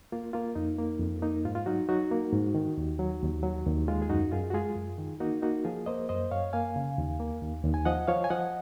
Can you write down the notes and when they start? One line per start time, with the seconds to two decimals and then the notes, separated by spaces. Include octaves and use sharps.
0.12 A#3 F4
0.33 A#3 F4
0.55 F2 D#4
0.78 A#3
1.00 F2
1.22 A#3 D#4
1.45 G#2 F4
1.55 F4
1.66 F#3 D#4 F#4
1.89 F#3 D#4 F#4
2.11 A#3
2.33 G#2
2.55 D#3
2.78 D#2
2.99 F#3
3.22 D#2
3.43 F#3
3.66 D#2
3.88 G#3 F4
4.02 G#4
4.09 F#2 D#4 F#4
4.32 F#2 F4 G#4
4.50 F#4
4.54 G#3 F4 G#4
4.76 F#2
4.98 D#3
5.20 A#3 D#4 F#4
5.42 A#3 D#4 F#4
5.65 F3 F4 G#4
5.86 A#3 C5 D#5
6.09 F#2 C5 D#5
6.31 F#2 C#5 F5
6.53 A#3 F5 G#5
6.76 C#3
6.98 D#2
7.20 A#3
7.42 D#2
7.64 D#2
7.74 G#5
7.85 F3 D#5 F#5
8.08 F3 C#5 F5
8.24 G#5
8.30 F3 D#5 F#5